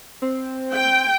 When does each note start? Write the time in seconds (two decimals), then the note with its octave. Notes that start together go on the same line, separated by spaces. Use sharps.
0.22 C4
0.73 G5